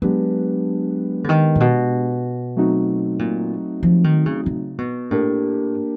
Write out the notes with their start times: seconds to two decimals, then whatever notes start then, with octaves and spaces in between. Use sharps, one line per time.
0.02 F#3 G#3 B3 D4 G4 B4
1.24 D3
1.29 D#3
1.55 A#2
1.60 B2
2.56 F#3 A3 C4 D#4 F#4
3.19 A#2
3.83 F3
4.04 D#3
4.26 C#3
4.46 C#3
4.78 B2
5.11 A2 A#3 D4 G4 A#4